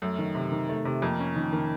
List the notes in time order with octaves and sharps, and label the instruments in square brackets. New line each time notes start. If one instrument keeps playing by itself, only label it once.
[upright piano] F#2 [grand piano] A3
[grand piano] D#3
C3
D#3
A3
C3
[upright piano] F2 [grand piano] A#3
[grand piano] C#4
D#3
D#3